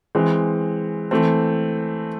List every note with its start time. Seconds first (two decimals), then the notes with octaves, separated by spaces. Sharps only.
0.15 E3 G#3 C4
1.11 E3 A3 C4